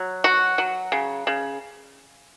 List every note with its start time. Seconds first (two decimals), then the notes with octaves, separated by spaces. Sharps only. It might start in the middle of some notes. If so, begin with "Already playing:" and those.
Already playing: F#3
0.24 F#4
0.58 F#3
0.92 C#3
1.27 C#3